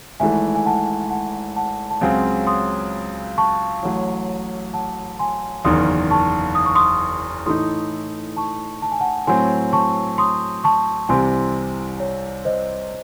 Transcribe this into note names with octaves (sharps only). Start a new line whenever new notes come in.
G#1 G#2 E3 A3 E5 G#5
G#5
F#5 A5
F#5 A5
F#5 A5
A5
C#2 C#3 F#3 C4 G#5 C6
C6 D#6
A5 C#6
A1 A2 F#3
F#5 A5
G#5 C6
F#1 E2 D#3 C6 D#6
A5 C#6
D#6
C#6
C6 D#6
A2 E3 A3 D#4 C6 D#6
A5 C#6
A5
G#5
F#5 A5
A2 F#3 C4 G#5 C6
A5 C#6
C6 D#6
A5 C#6
C2 C3 E3 C4 G#5 C6
C#5
C5 D#5